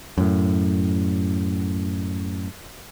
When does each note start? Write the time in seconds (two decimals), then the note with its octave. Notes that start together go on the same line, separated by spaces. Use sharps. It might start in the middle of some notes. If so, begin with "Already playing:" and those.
0.18 F#2 A2